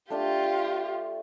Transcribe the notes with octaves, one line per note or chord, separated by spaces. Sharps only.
A3 D4 F4 G4 F5